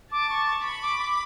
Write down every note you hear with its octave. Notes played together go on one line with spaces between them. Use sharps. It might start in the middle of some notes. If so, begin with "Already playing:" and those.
A5 D6
C#6
C#6
B5 C#6
D6
D6